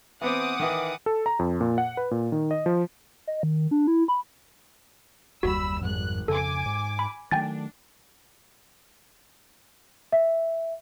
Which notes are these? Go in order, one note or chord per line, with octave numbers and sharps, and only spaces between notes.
E3 B3 C4 F#5 D6 D#6
D#3 E3
A4
A#5
F2
A#2
F#5
B4
A#2
D#3
D#5
F3
D#5
D#3
D4
E4
B5
F#1 D#2 G3 F#4 B5 E6
G#1 F2 G#2 G3 F#6
F2 C#3 A4 G#5 D6
G#2
B5
D#3 F#3 A3 D4 G5 G#5 A6
E5